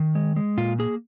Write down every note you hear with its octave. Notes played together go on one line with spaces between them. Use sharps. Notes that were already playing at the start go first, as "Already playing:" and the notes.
Already playing: D#3
G#3
G#3
A#2 F4
A#3 G#4